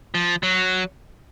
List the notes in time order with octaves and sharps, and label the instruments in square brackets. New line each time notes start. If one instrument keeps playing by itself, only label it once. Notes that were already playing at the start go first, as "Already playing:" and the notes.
[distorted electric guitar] F3
F#3